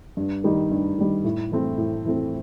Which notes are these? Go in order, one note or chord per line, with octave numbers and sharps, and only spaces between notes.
G2
D#3 G3 D#4
G2
D#3 G3 D#4
A2
E3 A3 C4
A2
E3 A3 C4